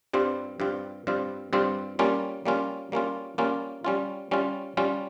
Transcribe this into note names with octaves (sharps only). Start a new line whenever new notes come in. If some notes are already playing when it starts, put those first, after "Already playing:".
G2 G3 C4 F4
G2 G3 C4 F4
G2 G3 C4 F4
G2 G3 C4 F4
G3 A#3 C#4 F4
G3 A#3 C#4 F4
G3 A#3 C#4 F4
G3 A#3 C#4 F4
G3 C#4 F4
G3 C#4 F4
G3 C#4 F4